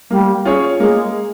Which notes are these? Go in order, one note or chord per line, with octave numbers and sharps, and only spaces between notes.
G3 A#3
C#4 F4 G#4 C#5
G#3 A#3